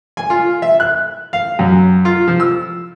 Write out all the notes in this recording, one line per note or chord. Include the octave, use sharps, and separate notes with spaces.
G#5
F4
E5
F#6
F5
F#2
F4
F3
E6